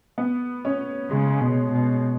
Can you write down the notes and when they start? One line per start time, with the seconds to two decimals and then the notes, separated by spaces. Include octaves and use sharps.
0.18 B3
0.65 C#4
1.10 C#3 G#3
1.40 B2
1.72 B2